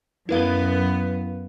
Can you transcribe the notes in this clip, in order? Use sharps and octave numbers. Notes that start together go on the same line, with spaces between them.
F#2 B3 E4 B4 F5